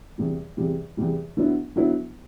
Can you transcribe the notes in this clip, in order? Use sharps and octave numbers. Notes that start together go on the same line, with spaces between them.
E2 C3 G3
E2 C3 G3
E2 C3 G3
D3 F#3 B3 E4
D3 F#3 B3 E4